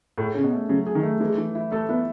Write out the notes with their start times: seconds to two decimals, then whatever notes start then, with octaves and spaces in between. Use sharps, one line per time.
0.17 A2 G#4
0.34 C#3 C#4
0.43 B2
0.53 A3
0.69 C#3 F#3
0.87 G#4
0.95 D#3
1.03 A3
1.20 E3 G#3
1.38 E3
1.55 E4
1.72 A3 A4
1.89 B3 E4